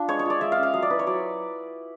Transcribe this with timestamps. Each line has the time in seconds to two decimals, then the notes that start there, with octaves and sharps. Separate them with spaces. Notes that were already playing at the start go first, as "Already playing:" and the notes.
Already playing: D4 F4
0.08 G#3 C#5
0.19 C#5
0.25 F4 D5
0.41 G#3 E5
0.52 F5
0.58 C#4
0.63 F5
0.74 F#3 D#5
0.82 D5
0.90 E4 B4
0.99 C#5
1.07 F#3 D5